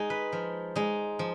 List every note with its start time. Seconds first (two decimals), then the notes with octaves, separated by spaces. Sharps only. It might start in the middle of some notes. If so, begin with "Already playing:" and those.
Already playing: G#3 D#4 G#4
0.10 B4
0.33 F3
0.75 G#3 D#4
1.19 F3